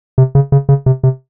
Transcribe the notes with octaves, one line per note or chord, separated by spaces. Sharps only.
C3
C#3
C#3
C#3
C3
C3